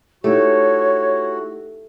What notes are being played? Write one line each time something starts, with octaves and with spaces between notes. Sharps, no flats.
A3 D#4 E4 F#4 G4 C#5